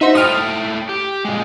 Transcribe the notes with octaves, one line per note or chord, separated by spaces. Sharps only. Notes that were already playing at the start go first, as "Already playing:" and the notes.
D#4 F#4 C5 E5
A3 E4 G5 D#6 F6
G4
A#2 G#3